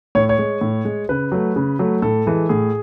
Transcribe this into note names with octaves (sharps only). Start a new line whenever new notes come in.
A2 C#5
C#5
G#3
A2
G#3
C#3 B4
F#3 A3
C#3
F#3 A3
A2 A4
E3 G#3
A2 G#4